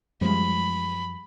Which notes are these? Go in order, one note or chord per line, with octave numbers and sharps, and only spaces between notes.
F#2 F3 G3 G#3 B5